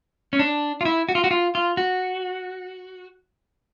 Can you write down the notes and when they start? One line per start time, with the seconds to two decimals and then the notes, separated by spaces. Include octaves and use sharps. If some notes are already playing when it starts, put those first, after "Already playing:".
0.33 C#4
0.39 D4
0.81 F4
0.85 E4
1.09 F#4
1.15 F4
1.24 F#4
1.31 F4
1.55 F4
1.77 F#4